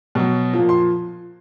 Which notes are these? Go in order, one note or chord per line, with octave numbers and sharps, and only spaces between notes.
B2 F#3
A#2 F3
C6